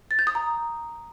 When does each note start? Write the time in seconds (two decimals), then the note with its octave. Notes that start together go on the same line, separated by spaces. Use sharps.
0.11 A6
0.19 G6
0.27 D#6
0.35 A#5